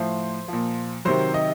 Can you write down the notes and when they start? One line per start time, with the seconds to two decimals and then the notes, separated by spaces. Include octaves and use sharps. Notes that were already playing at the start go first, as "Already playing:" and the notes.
Already playing: A2 F3 C5
0.48 A#2 F3
1.05 C3 D#3 F#3 C5
1.34 D#5